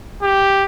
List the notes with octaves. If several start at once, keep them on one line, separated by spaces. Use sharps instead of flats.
G4